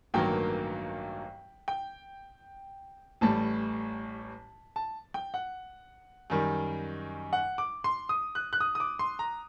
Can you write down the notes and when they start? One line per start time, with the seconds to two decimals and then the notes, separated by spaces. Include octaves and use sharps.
0.14 A1 G2 D#3 F#3 A#3 G5
1.68 G5
3.21 A1 A2 G3 A5
4.76 A5
5.14 G5
5.34 F#5
6.30 F#2 D#3 G3
7.33 F#5
7.58 D6
7.84 C6
8.09 D#6
8.35 F#6
8.53 F#6
8.60 D#6
8.75 D#6
8.80 D6
8.99 C6
9.19 A#5